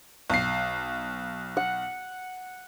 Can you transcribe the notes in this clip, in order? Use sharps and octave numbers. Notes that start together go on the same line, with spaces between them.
B1 C7
F#5